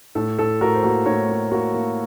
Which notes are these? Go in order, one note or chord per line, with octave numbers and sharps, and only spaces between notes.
A2 A4
A2 A4
A2 F#4 A#4
C5
A#3 F#4 A#4
A2 A#4 C#5
A#3
A#3 F#4 A#4
A#3